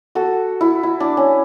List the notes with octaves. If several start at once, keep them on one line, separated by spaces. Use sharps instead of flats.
F#4 A4
E4
E4
D4
C#4